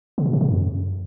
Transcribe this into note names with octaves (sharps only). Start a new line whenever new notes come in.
C#3
A#2
B2
C3
F#2